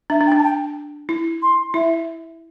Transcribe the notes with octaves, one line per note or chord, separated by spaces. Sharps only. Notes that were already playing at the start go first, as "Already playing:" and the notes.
D4 E5
D4
G5
D4
A5
G5
E4
C6
E4 E5